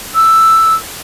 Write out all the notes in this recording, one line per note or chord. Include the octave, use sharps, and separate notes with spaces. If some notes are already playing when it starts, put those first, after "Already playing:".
E6